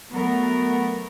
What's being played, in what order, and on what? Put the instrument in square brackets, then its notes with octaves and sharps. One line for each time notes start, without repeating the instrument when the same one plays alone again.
[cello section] F#3 A3 B3 A#4